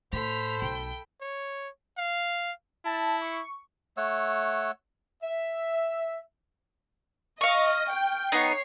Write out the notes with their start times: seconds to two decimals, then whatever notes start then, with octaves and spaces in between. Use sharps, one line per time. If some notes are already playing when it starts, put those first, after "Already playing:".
0.13 A2 A4 C5 B5 B6 F7
0.62 B1 G5
1.21 C#5
1.98 F5
2.85 E4 A5
3.22 C#6
3.97 A3 C#5 F#5 E6
5.23 E5
7.41 D#5 F5 C#6
7.91 G5
8.32 B3 D#4 C#5 C7